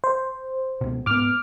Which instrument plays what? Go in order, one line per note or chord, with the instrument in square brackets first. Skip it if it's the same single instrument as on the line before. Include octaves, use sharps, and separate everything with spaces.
[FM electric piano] C5
[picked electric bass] C#2 B2
[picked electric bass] G#2 B3 [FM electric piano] D6 F6